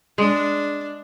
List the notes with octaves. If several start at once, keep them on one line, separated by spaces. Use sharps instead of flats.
G#3 D4